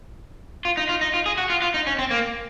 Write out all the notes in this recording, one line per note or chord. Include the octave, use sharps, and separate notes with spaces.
F4
D#4
F4
D#4
F4
G#4
F#4
F4
F4
D#4
C#4
C4
A#3